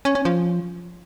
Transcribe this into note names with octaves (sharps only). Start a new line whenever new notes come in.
C#4
C#4
F3